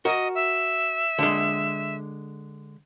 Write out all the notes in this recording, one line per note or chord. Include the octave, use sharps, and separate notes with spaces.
F#4 A#4 D#5
E5
D3 G#3